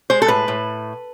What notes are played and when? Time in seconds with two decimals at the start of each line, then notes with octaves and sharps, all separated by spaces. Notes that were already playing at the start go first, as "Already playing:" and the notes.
0.10 G#3 C5
0.22 A4
0.28 A2 B4
0.48 A2